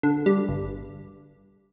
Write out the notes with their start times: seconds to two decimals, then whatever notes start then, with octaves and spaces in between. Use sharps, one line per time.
0.03 D3
0.26 G3
0.49 G1